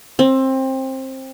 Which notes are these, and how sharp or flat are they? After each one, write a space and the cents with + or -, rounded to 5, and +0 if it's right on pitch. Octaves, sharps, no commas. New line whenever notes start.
C4 +20